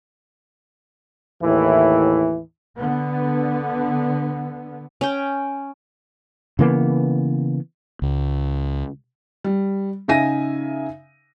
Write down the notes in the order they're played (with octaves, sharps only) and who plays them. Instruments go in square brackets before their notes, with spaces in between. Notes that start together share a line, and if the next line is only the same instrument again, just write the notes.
[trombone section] D#2 A2 E3 E4
[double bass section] D3 B3
[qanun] C#4 G5
[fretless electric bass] C#3 E3 A#3 B3
[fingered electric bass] C#2
[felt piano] G3
C#3 D#4 E5 G#5 A#6 D#7